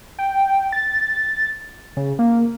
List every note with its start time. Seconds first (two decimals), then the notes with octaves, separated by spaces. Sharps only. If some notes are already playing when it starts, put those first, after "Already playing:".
0.19 G5
0.72 A6
1.97 C#3
2.19 A#3